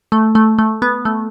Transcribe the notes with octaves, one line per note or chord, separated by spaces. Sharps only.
A3
A3
A3
B3
A3